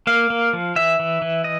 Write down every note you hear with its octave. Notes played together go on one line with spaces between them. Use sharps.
A#3 F5
A#3
F3
E3 E5
E3
E3
D#5